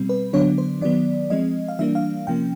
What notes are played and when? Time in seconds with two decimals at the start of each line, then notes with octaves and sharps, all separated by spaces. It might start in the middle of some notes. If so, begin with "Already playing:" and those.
Already playing: B2 G3 C4
0.09 B4
0.33 D3 F#3 B3 D4 C#5
0.58 C5
0.81 D#3 F#3 B3 D5
1.30 F3 G#3 C4 D#5
1.68 F5
1.79 E3 G3 A#3 D4 E5
1.95 F5
2.27 C3 F3 A#3 C#4 G5